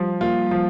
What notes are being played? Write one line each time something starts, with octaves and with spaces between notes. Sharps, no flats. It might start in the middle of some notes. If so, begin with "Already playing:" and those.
Already playing: F3 G3
A#3 F4
F3